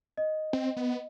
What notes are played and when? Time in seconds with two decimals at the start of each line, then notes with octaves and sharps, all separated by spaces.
0.17 D#5
0.53 C4
0.77 B3